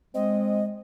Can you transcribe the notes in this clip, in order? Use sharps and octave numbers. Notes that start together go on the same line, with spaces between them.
G#3 C4 D#5